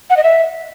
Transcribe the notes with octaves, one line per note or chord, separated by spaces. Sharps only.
F#5
D#5
E5